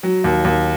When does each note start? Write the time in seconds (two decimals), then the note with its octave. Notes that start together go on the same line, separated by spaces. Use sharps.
0.03 F#3
0.24 D#2
0.44 D#2